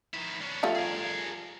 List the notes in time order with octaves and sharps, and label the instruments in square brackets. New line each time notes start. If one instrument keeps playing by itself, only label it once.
[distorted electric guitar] D#3 E4
C#4 D4
[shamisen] F3 G3 A3
[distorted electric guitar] G#4 A#4